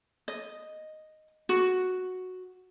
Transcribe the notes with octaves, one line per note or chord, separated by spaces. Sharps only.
D#5
F#4